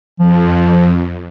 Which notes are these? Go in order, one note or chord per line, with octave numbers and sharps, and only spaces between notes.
F2 F3